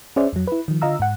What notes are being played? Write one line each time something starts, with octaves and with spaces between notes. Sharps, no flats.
C#4 G#4 C5 D5 E5
F2 F#3
E4 B4
D#3 F3
D3 F4 D#5 F5 A#5 E6
G#2 F#5